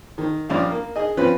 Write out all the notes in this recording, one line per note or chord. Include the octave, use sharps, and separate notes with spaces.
D#3
A#1 G3 C#4 F4 F5
A#3
G#4 D#5
F3 C4 C#4 F4 B4